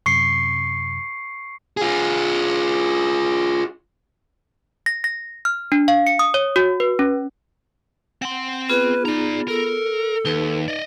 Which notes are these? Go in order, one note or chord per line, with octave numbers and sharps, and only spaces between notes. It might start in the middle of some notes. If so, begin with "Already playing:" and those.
F#2 C3 C#6 C7 C#7
F4 G#4
A#6
A#6
F6
D4
F5
C#7
D#6
C#5
F#4
B4
C#4
C4 F#5 C6
B3 F4 G#4 B4
D#4 D5 A#5
A4 A#4
D#2 D#4 B4 A5
D5 D#5